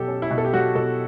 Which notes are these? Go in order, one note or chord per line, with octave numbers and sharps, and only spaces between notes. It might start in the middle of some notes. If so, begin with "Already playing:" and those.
Already playing: B2 F#3 G4 A4
C#4
E4
B2
A4
G4
F#3 F#4
B2 A4